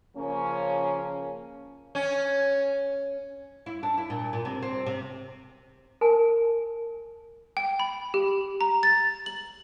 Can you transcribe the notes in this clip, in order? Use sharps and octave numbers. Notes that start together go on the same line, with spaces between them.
C#3 F3 A#3 C#4
C#4
E4
D4
E4
A#2
A#2
C3
C4
C3
A#4 G#5 A5
G5
B5
G4
A#5
A6
F#7